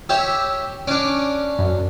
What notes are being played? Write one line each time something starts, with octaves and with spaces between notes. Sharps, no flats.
G4 C#5 E5 E6
C#4 D4 D6
F#2